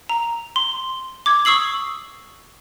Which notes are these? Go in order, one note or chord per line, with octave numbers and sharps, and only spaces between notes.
A#5
C6
D6 G#6
C#6 D#6 E6 C7 F#7